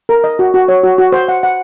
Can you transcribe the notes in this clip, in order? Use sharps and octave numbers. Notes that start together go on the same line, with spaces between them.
A#4
D#5
F#4
F#4
C#5
F#4
F#4
C5
F#5
F#5